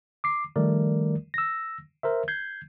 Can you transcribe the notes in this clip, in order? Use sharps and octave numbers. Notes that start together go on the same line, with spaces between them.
D6 C7
D#3 F3 G3 A3 A#4 D5
E6 A#6
A#4 C5 E5
G6 G#6 C7